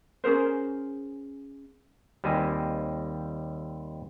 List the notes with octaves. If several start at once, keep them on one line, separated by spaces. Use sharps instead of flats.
C#4 G#4 A#4 C5
D#2 G3 C4 D#5 G#5